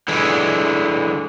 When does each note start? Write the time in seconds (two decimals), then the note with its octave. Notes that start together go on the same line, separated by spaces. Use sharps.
0.08 D3 E3 G#3